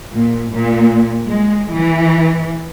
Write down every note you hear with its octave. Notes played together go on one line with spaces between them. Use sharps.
A#2
A#2
G#3
E3